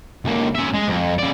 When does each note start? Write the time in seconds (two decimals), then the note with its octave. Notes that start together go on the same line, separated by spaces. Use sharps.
0.25 C#2 A#3
0.55 C#4 E5
0.74 G#3
0.88 F2
1.18 C#3 D5